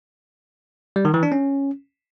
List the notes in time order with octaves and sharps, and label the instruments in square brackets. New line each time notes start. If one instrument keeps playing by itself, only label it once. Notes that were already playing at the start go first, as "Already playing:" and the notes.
[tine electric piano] G3
D#3
E3
D4
C#4